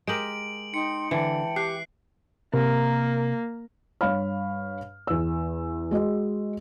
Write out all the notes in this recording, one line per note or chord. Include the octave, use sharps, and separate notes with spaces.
G#3 G4 A#4 D7 F#7
D#4 G5 C6 C#7
D3 E3 G5 A5
G4 F#6 C7
C3 A#3 A#4
G2 C#5 F5 B5 F6
E2 E6
G#3 F#4 D#5